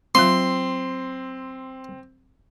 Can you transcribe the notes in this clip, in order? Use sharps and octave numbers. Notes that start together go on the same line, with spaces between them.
F#3 C4 F4 F5 C6